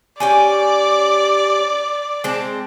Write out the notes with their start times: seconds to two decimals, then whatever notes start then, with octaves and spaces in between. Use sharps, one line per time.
0.20 C#4 G4 D5 G#5
2.24 G#3 C4 A5